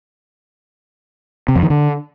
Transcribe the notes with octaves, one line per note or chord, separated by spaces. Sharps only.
C3
F2
D#3
D3